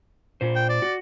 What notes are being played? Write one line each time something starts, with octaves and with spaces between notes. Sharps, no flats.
A#2 C5
G5
D5
F#4